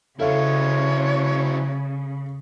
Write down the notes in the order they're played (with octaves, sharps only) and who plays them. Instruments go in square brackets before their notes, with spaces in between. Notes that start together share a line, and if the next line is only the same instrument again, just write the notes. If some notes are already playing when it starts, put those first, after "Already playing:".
[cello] C#3 [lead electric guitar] F#3 E4 [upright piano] A4 F5 [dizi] C#5